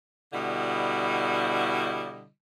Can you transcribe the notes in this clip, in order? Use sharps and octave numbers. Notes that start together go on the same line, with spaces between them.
B2 D3 G3 E4 D#5